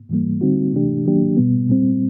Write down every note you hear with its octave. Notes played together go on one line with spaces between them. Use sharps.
G#2 E3 G3 A#3
D3 G3 C4 D#4 F#4
C3 E3 A3 D4 G4
D#3 F#3 A#3 D4 G4
B2 G3 B3
A#2 G3 C4